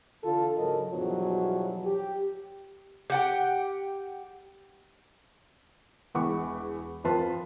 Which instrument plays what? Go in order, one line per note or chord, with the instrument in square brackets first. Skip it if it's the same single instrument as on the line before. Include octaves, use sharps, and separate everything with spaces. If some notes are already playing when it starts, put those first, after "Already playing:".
[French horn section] D3 E3 F4 A4
G#2 C#3 F#3 A4 A#4 D#5
E2 G2 B2 F3 F#3
G4
[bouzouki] G4 F#5 G5
[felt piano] E1 E2 F#5 B5 C#6 D6
F2 F4 A#4 B4 A5 C6